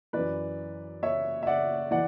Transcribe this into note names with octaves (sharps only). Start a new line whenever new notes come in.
F#2 E3 B4 D5
C#5 E5
E5
D5 F#5
E3 D5 F#5